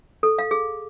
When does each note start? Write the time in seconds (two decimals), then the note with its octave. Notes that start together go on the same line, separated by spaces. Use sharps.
0.23 A4
0.39 F5
0.51 G#4